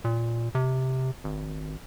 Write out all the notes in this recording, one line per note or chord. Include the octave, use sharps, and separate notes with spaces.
A#2
C3
G#1